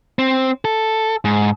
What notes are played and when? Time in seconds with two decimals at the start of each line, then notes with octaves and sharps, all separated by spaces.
0.19 C4
0.65 A4
1.25 G#2